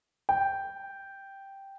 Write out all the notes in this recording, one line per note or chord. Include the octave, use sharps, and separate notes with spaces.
G5